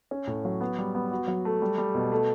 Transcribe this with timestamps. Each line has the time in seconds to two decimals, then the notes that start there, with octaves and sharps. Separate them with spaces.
0.11 C#4
0.27 A2
0.45 F#3
0.61 B3
0.79 G3
0.95 B3
1.12 F#4
1.27 F#3
1.45 A3
1.62 G3
1.78 G3
1.95 B2
2.12 A3